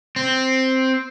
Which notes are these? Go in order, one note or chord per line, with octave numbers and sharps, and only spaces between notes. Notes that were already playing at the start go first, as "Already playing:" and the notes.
C4